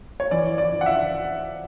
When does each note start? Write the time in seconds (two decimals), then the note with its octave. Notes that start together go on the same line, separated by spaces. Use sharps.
0.20 C#5
0.31 E3 D5
0.58 D5
0.72 E3
0.81 F#5
0.86 E5